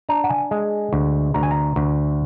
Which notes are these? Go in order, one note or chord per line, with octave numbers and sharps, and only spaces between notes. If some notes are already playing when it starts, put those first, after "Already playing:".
D4 A#5
F#5
G#5
G#3
D2
D2 A#5
G#5
A#5
D2